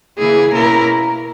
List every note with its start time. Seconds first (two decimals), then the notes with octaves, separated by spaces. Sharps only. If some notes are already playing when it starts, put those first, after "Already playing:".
0.18 C#3 E3 A#3 E4 G#4
0.52 B2 A#3 C#4 E4 A#4